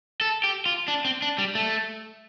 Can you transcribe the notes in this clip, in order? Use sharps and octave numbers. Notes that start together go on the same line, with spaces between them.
A4
G4
F4
D4
C4
D4
G3
A3